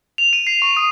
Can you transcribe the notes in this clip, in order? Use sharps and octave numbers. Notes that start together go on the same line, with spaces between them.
F7
D#7
C7
C#6
D#6